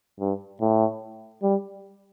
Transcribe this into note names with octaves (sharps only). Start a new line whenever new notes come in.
G2
A2
G3